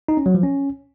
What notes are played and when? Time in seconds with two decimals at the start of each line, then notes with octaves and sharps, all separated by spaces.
0.08 D#4
0.17 C#4
0.26 F#3
0.35 F3
0.43 C#4